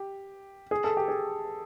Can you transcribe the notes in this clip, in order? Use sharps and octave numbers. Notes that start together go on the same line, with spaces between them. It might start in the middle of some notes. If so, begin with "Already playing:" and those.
Already playing: G4
G#4
A4
G4
G#4